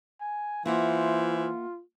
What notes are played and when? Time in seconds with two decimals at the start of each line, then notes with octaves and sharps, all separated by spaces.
0.20 G#5
0.66 E3 A#3 F4 C5 E5 F#5